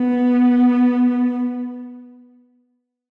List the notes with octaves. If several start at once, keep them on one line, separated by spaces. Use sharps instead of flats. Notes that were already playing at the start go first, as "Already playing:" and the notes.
Already playing: B3